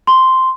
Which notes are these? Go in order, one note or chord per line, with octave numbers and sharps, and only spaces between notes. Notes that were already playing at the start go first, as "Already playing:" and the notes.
C6